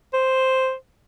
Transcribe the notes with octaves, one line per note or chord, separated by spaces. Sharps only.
C5